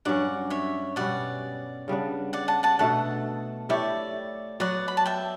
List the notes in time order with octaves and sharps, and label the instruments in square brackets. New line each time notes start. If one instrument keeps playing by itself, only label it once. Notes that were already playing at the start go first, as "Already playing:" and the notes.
[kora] G2 F#3 C#4 [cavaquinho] D5 F#5
[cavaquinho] C#5 E5
[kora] B2 G3 C#4 [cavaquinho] D5 F#5
[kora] C#3 G3 B3 D4
[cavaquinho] D5 F#5
F#5 A5
F#5 A5
[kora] B2 A3 D4 [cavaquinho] F#5 A5
[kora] A3 E4 G4 C#5 [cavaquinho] D5
[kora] F#3 B3 F#4 [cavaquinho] D5 F#5
[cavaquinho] B5
A5
E5 G5